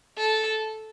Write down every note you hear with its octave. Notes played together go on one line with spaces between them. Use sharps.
A4